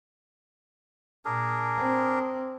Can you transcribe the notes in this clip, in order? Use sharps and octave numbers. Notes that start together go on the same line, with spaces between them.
A#2 D4 G#4 A#4
C4